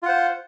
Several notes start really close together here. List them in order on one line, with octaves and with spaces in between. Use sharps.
F4 F#5 C5